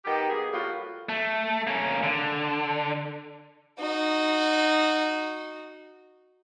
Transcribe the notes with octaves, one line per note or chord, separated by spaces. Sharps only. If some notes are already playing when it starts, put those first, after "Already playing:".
D#3 B3 G4
B2 A#3 G#4
A2 G3 A#3 F4 F#4
A3
A#3 C#4
D3
D#4 F#4